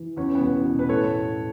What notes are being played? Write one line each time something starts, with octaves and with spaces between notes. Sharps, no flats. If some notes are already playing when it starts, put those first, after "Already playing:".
Already playing: E3
E2 C#4
B3
E1
B2
B4
A2 A4 C#5